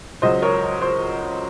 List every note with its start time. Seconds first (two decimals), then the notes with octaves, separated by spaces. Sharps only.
0.22 C#2 C#3 F#3 C5 D#5
0.42 A#4 C#5
0.82 C5